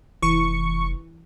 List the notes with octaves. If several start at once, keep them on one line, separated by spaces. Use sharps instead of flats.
F1 E3 C#6